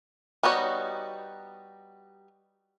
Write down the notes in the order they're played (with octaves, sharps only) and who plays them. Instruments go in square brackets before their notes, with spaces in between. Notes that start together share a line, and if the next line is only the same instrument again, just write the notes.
[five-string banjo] G3 B3 D#4 F#4 C#5